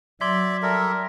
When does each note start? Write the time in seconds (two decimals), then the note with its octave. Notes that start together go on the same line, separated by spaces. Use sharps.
0.21 F#3 D5 E5 C6 G#6 B6
0.63 G3 A4 A#4 E5